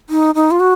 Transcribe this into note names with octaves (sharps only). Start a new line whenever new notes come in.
D#4
D#4
F4
F#4